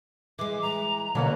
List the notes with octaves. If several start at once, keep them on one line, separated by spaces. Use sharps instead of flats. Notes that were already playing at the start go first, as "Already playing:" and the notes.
E3 G#3 D6
A#5
B2 D3 F#3 A#3 B3 C#4